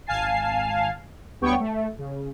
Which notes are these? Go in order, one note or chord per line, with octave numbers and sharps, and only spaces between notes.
G#1 F5 G#5 A5 C7
D2 G3 B3 C#5 G5 C#6
A3
C#3